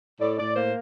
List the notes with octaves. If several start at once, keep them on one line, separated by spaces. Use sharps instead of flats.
A2 D5
A2 D5
A#3 C5